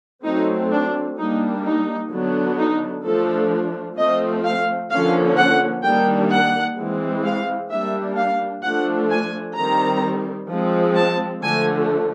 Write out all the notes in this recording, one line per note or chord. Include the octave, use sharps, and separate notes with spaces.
F#3 A3 C4 D#4
D4
G3 A#3 D4 D#4
D#4
D3 F#3 B3 D4
D#4
F3 A3 D4 A4
F3 A3 C4 D#5
F5
D3 F3 A#3 C#4 F5
F#5
D#3 G3 A#3 D4 G5
F#5
E3 G#3 C4
F5
G3 A#3 D4 E5
F5
F3 A3 D4 F#5
G#5
D#3 G3 C4 A#5
F3 G#3 C4
A5
D3 F3 A3 G#5